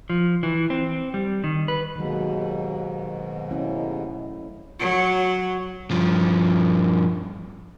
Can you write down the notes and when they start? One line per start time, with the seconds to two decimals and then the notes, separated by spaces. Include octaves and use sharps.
0.10 F3
0.43 E3
0.70 C4
1.14 G3
1.44 D#3
1.68 B4
1.96 D#2 G#2 B2 D#3 F#3
3.51 A3 C#4 E4
4.80 F#3
5.91 G2 F3